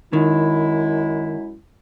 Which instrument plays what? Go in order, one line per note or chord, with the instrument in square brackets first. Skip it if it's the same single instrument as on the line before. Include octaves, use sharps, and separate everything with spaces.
[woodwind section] F#2 G#3 E4 [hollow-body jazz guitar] D#3